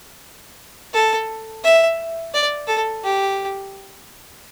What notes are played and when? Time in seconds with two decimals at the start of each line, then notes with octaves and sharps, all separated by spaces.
0.94 A4
1.64 E5
2.34 D5
2.68 A4
3.04 G4